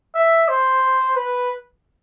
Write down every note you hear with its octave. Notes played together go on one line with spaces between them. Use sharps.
E5
C5
B4